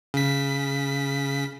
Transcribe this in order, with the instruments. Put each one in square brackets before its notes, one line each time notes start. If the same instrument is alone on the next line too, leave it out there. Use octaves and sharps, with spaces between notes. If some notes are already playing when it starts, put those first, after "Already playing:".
[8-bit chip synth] C#3 B6